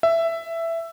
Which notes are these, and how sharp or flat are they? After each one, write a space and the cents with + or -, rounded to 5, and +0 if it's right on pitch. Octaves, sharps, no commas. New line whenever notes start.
E5 +10